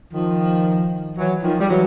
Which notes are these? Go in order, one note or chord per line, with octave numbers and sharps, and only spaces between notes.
D#3 F3
E3 F#3
D#3 F3
G3
E3 F#3